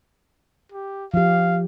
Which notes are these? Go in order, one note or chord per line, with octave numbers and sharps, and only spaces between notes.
G4
F3 G4 F5